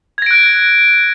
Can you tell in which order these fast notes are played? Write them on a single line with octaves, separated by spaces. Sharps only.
G#6 A#6 D7 F#6